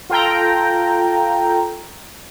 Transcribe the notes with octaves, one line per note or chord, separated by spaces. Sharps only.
F4 A4 G5 A#5